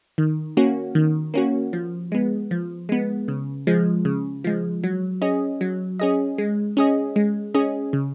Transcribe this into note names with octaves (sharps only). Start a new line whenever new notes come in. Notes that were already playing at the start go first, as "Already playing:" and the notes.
D#3
A#3 C#4 F#4
D#3
A#3 C#4 F#4
F3
G#3 B3
F3
G#3 B3
C#3
F3 G#3
C#3
F3 G#3
F#3
C#4 G#4 D#5
F#3
C#4 G#4 D#5
G#3
C#4 G#4 D#5
G#3
C#4 G#4 D#5
C#3